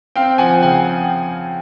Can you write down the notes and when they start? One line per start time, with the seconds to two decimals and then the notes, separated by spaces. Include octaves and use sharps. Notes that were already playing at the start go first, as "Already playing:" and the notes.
0.16 C4 F5 G5
0.38 F3 F#5 G#5
0.62 C#3 F#5 G#5